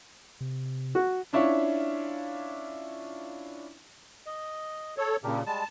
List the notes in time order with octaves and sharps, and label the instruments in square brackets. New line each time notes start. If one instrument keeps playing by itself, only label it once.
[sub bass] C3
[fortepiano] F#4
[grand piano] C#4 D4 E4 F4 C#5
[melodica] D#5
[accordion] A4 C#5
[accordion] A#2 C#3 [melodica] D4 G4 A#4
[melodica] G3 G#3 [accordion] A5